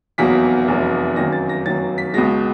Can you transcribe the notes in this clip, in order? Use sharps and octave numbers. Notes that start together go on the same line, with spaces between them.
F1 E2 B2 F#3 A#3 B6
F1 E2 B2 F#3 A#3
F#2 D#3 F#3 A#3 A#6
A6
A#6
F#2 D#3 F#3 A#3 A6
B6
C#2 B2 G#3 A#6